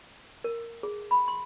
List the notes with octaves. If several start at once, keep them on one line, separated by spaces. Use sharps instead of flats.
A#4
G#4
B5
C6